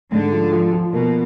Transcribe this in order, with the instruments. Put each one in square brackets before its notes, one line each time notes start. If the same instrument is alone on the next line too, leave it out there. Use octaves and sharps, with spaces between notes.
[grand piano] G#2 [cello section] D3
[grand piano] F3
F3
F3
[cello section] B2 [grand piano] A#3